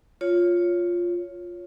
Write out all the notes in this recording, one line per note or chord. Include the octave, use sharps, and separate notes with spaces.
F4 C#5